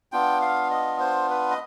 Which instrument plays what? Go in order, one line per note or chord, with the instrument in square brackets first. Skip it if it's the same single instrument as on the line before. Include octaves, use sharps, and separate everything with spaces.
[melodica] B3 D4 F4 G5
F5
D#5
C5
B4
D#5